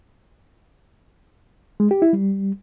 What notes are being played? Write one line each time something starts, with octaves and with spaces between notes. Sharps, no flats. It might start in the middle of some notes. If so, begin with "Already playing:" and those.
G#3
G4
E4
G3